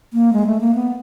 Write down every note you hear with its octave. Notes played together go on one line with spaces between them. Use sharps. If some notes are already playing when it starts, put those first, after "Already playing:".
A#3
G#3
A3
A#3
B3